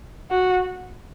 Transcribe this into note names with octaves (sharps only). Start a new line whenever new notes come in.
F#4